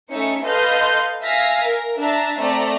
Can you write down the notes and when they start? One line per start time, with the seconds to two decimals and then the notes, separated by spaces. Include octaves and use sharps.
0.10 A3 C#4 D#4 E5 C#7
0.45 A4 B4 D#5 F5 C6 G6
1.24 E5 F5 G#5 A#6 B6
1.63 A#4
2.00 D4 E5 A5 A#5
2.38 A3 C4 A4 D5 E5 A#5